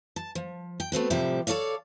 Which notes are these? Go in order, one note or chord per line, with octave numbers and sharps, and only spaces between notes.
A5
F3
G5
A3 B3 C4 F#4
A2 C3 F3 G3 G4 E5
A4 A#4 C#5 D5 F5